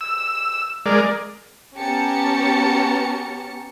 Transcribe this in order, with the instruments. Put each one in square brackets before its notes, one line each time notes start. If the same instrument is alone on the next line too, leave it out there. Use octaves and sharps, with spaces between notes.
[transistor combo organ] E6
G#3 A#4 D5
[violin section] B3 C#4 G4 A5 A#5 C#7